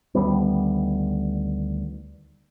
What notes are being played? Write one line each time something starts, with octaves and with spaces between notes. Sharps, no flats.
D2 D#3 G3 B3